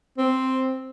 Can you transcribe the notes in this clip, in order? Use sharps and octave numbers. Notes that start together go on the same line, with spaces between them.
C4